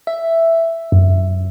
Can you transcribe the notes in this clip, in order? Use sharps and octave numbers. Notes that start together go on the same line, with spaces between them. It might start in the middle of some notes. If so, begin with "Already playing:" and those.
E5
F#2